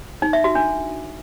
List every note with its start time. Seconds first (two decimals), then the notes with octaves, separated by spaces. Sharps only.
0.22 D#4
0.33 E5
0.44 F#4
0.55 D4